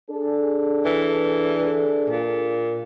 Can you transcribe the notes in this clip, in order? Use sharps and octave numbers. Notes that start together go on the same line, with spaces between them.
D4 G#4 A4
E3
A#2